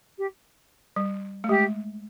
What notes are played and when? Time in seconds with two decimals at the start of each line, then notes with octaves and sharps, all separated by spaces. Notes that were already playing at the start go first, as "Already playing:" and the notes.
0.18 G4
0.96 G3
1.44 A3
1.49 G#3 G4